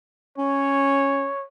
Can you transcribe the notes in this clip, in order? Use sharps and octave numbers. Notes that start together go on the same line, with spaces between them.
C#4 C#5